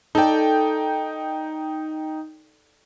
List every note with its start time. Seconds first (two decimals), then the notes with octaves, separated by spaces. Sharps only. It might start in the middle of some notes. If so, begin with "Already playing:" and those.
0.15 D#4 A4 D5 G5